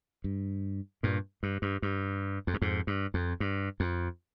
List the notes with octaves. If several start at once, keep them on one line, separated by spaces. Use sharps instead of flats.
G2
G2 A#2
G2
G2
G2
F2
G2
F2 G#2
G2
F2
G2
F2